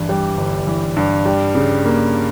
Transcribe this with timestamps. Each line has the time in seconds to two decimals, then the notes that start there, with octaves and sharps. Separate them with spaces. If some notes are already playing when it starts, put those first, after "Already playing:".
Already playing: G2 E3
0.09 G3
0.37 G1
0.67 E3
0.97 G2
1.26 G3
1.55 C#3
1.85 A#3